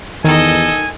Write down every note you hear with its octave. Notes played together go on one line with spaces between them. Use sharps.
E2 D#3 A4 D#5 G#5